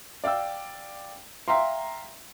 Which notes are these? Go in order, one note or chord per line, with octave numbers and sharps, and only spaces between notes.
D5 F5 G5 E6
E5 F5 G5 A#5 C6